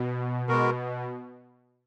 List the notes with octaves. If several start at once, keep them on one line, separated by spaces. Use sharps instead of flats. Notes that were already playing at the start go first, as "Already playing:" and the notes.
Already playing: B2
B2 G#3 B3 F#4 A#4